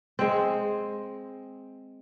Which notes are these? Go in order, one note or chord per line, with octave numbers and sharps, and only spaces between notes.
G#3 C4